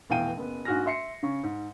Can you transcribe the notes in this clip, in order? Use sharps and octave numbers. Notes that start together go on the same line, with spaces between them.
F1 B2 E3 F5 G5 D#7
F#1 B3
A#1 G#2 F#4 G#5 F6 A#6
E5 C6 C7 C#7
C#3 C#6
G#2